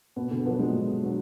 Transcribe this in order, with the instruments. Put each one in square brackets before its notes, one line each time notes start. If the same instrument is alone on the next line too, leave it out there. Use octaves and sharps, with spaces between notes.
[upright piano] B2 [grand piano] B3
[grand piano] D3
[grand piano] F3 [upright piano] F#3 B3 D4 F#4
[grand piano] G#3
[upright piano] B2
F#3 B3 D4 F#4